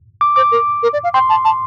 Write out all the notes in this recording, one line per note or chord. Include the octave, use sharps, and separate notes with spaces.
D6
C5 D6
A#4
A#4
D5
F5
G5 C6
A5
A5